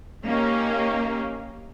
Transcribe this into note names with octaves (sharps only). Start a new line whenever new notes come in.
A#3 C#4 D#4 G4